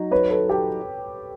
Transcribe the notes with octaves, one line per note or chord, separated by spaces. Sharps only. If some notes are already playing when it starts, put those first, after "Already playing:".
Already playing: F#3 D#4
B4 C#5
A4 B4
G4 A4